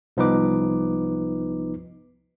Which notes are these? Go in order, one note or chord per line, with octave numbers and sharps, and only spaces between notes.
C2 F3 B3 D#4 B4 D6